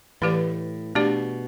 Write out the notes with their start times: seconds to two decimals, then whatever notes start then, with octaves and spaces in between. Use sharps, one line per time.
0.22 A2 E3 A3 G4 B4 D5
0.95 B2 A3 D4 G4 D5